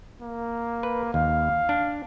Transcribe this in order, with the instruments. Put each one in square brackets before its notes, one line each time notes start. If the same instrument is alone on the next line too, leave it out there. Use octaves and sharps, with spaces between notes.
[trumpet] A#3
[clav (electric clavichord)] B4
[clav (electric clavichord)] D#2 [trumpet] F5
[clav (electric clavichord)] D4